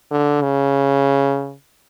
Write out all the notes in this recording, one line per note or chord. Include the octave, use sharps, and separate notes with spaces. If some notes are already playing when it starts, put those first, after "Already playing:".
D3
C#3